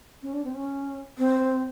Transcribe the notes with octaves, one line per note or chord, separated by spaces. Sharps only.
C#4
D4
C4
C#4
C4